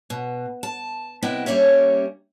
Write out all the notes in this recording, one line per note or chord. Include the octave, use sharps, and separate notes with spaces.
B2
A5
C3 B3 E4 D#5 G5
G3 A#3 C#4 C#5 E5